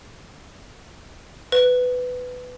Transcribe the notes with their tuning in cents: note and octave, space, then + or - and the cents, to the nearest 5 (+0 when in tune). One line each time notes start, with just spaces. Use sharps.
B4 +15